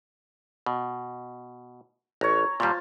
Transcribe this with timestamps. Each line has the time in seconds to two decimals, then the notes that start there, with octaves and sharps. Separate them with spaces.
0.66 B2
2.21 A1 C#5 A#5
2.60 A#2 G3 F4 C5 A5